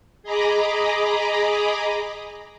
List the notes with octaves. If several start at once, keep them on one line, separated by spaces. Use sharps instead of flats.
G#4 D#5 A#5 B5 D6